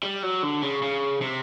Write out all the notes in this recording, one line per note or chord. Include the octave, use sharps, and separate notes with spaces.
G3
F#3
D3
C#3
C#3
C3